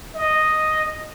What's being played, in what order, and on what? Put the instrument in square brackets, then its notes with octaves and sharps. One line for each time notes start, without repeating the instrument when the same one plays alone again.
[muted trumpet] D#5